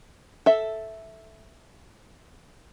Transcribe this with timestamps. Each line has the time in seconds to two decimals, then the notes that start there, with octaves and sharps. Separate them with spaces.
0.46 A4 E5